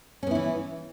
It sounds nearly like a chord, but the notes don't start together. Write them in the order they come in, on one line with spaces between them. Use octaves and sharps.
C#4 B3 E4 E3